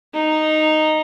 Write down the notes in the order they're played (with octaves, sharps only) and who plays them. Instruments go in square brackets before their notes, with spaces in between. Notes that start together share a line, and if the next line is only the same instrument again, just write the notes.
[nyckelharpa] D#4